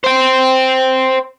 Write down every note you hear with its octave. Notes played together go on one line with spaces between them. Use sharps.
C5 G5